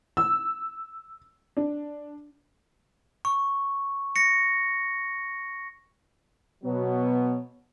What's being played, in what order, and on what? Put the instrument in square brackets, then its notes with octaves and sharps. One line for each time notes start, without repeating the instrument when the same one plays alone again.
[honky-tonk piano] E6
D4
[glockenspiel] C#6
A#6 C#7
[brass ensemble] B2 F#3 B3